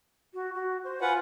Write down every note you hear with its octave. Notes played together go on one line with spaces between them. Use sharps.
F#4
F#4
C5
F4 B4 F#5 G#5